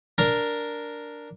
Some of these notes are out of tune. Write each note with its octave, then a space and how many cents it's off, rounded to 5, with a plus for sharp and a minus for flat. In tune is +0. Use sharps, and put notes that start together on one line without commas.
D4 +0 A#4 +0 A#5 +0